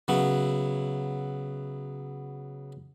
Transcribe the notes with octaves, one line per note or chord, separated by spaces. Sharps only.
C#3 F#3 B3 E4